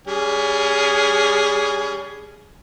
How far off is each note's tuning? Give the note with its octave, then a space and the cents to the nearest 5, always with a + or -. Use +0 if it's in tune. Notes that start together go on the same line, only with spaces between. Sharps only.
G3 +20 C#4 +35 G#4 +0